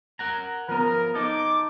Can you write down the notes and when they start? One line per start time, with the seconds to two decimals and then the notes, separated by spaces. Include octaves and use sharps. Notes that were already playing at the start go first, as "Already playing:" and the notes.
0.19 A#4 F#5 A#5
0.69 F3 B3 A#4
1.15 D#4 A4 D6